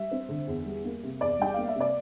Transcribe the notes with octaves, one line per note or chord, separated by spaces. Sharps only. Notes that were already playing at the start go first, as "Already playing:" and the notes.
Already playing: G3 E5
C4
D3
E2
G3
A#3
C3
E2 D5
G3 G5
A#3 F5
E5
C3
D5